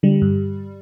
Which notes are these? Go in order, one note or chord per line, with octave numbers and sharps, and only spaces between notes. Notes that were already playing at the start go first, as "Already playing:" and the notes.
D3 G3
G2